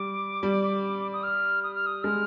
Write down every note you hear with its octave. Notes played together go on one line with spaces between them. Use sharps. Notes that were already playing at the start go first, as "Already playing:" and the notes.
Already playing: G3 D6
G3
D#6
F6
D#6
F6
D#6
G#3 F6